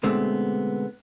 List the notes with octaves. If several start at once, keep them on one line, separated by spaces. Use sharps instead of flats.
B2 D3 G#3 A3 B3 C4